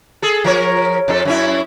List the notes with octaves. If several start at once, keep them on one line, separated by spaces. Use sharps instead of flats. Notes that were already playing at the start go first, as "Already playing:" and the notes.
G#4 A4
F3 A#4 C#5
F2 D4 A4
F#2 C#4 E4